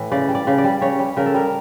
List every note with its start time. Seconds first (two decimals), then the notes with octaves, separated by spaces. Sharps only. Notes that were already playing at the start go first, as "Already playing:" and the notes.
Already playing: A2 E3
0.12 C#3 D5
0.28 G3
0.35 D5
0.47 C#3
0.58 D5
0.64 G3
0.82 C#3 C#5
0.99 G3
1.17 C#3 A#4
1.26 A4
1.34 G3 A#4